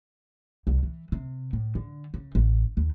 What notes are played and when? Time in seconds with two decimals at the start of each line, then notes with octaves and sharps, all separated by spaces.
0.67 C2
0.83 E3
1.12 C3
1.53 A2
1.75 D3
2.14 C#3
2.35 A1
2.77 D#2